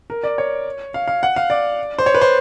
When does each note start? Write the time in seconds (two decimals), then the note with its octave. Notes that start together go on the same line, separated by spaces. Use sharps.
0.10 A#4
0.24 D5
0.38 C#5
0.94 F5
1.08 F5
1.23 F#5
1.36 F5
1.50 D5
1.99 C5
2.06 C#5
2.14 B4
2.21 C5